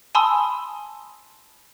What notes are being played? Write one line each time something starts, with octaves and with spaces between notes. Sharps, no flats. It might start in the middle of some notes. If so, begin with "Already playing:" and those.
G#5 A5 B5 C6 D#6 E6